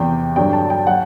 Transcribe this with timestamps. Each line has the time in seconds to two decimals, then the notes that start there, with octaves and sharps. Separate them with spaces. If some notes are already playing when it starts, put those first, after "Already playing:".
Already playing: E2 C3 E3 G5
0.36 G2 D3 F#3 G5
0.53 A5
0.70 G5
0.87 F#3 F#5